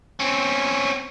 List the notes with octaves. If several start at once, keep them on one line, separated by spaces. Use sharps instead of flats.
C4 C#4